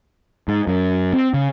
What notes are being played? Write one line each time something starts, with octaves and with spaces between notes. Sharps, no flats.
G#2
F#2
C4
C#3